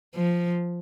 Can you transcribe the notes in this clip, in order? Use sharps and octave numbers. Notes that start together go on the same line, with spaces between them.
F3